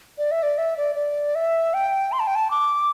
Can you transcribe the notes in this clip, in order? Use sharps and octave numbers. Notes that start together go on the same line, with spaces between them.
D5
E5
D5
E5
D5
D5
E5
G5
C6
A5
G5
A5
D6